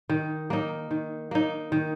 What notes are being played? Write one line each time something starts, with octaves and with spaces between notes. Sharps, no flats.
D#3
A#3 D#4
D#3
A#3 D#4
D#3